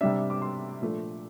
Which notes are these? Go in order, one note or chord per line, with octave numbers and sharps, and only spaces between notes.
C3 G3 D4 E5
D6
C6
A#2 F3 A3 D4